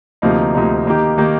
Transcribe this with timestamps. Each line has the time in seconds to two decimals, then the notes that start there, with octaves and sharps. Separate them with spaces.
0.22 D2 C3 F3 A#3 D#4
0.55 D2 C3 F3 A#3 D#4
0.87 D#3 A#3 D#4 G4
1.18 D#3 A#3 D#4 G4